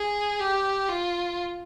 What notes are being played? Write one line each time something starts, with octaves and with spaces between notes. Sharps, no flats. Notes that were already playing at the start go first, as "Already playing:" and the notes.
Already playing: G#4
G4
F4